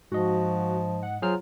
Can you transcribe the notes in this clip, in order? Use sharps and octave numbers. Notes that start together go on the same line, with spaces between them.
G#2 F3 F#4 D#5
F#5
F#3 F4 G#4 C5 F6